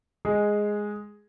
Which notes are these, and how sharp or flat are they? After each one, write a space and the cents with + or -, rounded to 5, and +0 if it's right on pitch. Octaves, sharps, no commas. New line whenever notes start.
G#3 +0 G#4 +0